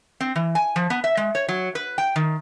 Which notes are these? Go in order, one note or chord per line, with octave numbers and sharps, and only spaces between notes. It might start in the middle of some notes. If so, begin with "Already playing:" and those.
C4
E3
G#5
F3
B3
E5
G#3
C#5
F#3
B4
G5
D#3